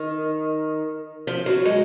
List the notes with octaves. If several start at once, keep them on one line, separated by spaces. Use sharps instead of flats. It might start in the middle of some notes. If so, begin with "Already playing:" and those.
Already playing: D#3
F3
F#3
G#3